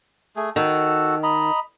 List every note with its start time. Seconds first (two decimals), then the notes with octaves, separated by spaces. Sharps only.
0.36 A3 G#4
0.56 D#3 F#4 A4
1.23 D#5 A#5 B5